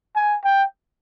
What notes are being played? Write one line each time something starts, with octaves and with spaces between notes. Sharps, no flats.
G#5
G5